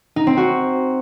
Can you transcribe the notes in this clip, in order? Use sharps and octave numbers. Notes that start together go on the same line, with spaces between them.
D#4
C4
F#4